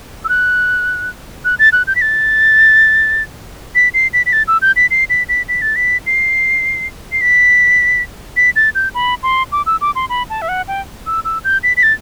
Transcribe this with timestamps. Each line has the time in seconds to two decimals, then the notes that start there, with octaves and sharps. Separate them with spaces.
0.25 E6
0.29 F#6
1.45 F#6
1.59 A6
1.73 F#6
1.87 G6
1.96 B6
2.02 A6
3.75 B6
3.94 C7
4.13 B6
4.26 B6
4.33 A6
4.48 E6
4.62 G6
4.76 B6
4.91 C7
5.10 B6
5.29 B6
5.48 B6
5.62 A6
5.76 B6
6.06 C7
7.12 C7
7.21 B6
8.36 B6
8.56 A6
8.75 G6
8.94 B5
9.23 C6
9.52 D6
9.66 E6
9.81 D6
9.95 C6
10.09 B5
10.30 A5
10.42 E5
10.49 F#5
10.68 G5
11.07 E6
11.25 E6
11.44 G6
11.63 B6
11.77 B6
11.83 A6